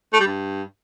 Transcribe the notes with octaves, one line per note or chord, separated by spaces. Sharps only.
A3
G3
G2